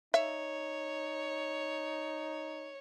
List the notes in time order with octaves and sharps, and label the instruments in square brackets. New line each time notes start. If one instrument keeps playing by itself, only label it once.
[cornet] D#4 [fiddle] C#5 [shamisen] E5